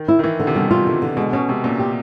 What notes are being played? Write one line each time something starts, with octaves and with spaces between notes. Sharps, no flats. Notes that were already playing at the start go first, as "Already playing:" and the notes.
Already playing: D#3
E4
D#3
E3 E4
D3
C3
B2 G3
F4
D3
D3
B2 G#3
B2 C#4
C3 G#3
A#2 C#4
G4